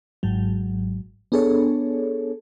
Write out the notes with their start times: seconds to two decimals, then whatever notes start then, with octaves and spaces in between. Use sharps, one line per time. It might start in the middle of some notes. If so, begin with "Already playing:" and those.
0.23 G#1 G#2 F#3
1.32 B3 D4 G#4 A4 C#5